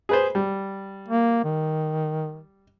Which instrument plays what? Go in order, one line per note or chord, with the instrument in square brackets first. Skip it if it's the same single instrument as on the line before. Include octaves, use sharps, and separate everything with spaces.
[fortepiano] G#4 B4 C5
G3
[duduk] A#3
D#3